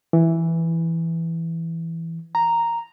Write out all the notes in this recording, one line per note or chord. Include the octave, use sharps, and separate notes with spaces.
E3
A#5